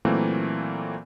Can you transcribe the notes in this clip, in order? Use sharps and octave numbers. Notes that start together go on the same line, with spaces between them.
A#2 E3 F#3 A3 A#3 C4